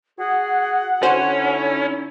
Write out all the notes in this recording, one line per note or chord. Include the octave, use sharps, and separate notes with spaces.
F#4 G#4 F#5
D3 C#4 D#4 E4 F#4 C5